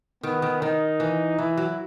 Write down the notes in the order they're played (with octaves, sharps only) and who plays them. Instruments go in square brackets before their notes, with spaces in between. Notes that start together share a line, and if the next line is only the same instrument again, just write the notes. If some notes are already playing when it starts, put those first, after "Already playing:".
[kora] D#3 [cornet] B3
[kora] D#3
[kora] D#3 [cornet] D#4
[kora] E3
[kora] E3 [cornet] E4
[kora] F#3